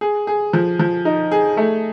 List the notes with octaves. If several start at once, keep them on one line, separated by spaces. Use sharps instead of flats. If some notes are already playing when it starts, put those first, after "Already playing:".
G#4
G#4
F3
F3
D#4
G#4
A3